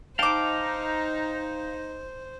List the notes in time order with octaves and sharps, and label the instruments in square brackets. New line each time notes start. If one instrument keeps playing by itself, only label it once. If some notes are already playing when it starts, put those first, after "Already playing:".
[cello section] D#4 [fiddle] C5 [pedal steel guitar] F5 G5 [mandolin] A5 D6